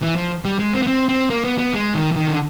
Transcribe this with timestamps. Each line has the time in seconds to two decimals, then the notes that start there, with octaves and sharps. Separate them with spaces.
0.02 E3
0.16 F3
0.45 G3
0.59 G#3
0.73 C4
0.82 B3
0.87 C4
1.09 C4
1.30 A#3
1.44 B3
1.58 B3
1.74 G#3
1.95 D#3
2.12 E3
2.16 D#3
2.27 D3